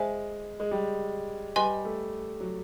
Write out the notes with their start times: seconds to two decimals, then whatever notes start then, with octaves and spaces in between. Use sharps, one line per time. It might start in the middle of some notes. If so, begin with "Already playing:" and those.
Already playing: G#3 C5 E5 G#5
0.60 G#3
0.71 G3
1.56 G3 B4 D#5 G#5 C6
1.85 A3
2.40 F#3